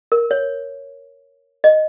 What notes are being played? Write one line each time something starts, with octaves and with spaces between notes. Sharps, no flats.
A#4
C#5
D#5